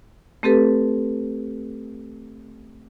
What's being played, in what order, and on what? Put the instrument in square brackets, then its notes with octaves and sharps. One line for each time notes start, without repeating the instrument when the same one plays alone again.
[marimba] A3 C4 G4 A4 B4